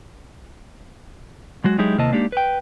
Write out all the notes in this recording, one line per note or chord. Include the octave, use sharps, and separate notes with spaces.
F#3 G#3 F#4
F#3 G#3 D#4 E4 G4 G#4
D#2 C3 A#3 E4 D#5 A5
G#3 A#3 D4 D#4 G4
B4 G5